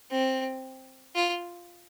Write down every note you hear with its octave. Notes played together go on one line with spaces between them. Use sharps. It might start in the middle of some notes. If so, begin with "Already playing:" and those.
C4
F4